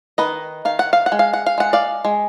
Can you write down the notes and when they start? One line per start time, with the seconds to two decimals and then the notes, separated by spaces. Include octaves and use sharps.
0.18 D#3 B4 D#5
0.65 D#3 F5
0.79 F#5
0.93 F5
1.06 F#5
1.12 G#3
1.19 F5
1.33 F#5
1.46 F5
1.58 G#3 F#5
1.73 D5 F5
2.05 G#3